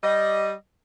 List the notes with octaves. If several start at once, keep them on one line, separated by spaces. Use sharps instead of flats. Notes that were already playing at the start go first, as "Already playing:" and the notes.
G3 D#5